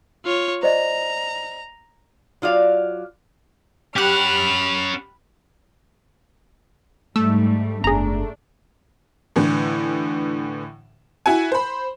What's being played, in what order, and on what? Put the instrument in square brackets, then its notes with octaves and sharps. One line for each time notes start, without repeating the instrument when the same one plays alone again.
[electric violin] F4 C#5
[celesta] C5 D5 D#5 [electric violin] A#5
[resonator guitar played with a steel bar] F#3 F4 D5 F5
[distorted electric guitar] C#4 F#5 [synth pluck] G4 F#6 [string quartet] B5 F6
[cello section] G#2 G3 [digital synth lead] A3 [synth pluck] E6
[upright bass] F#1 B3 [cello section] D4 [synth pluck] G#4 A#5
[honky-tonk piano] A2 D3 E3
E4 F#4 G#5
C5 B5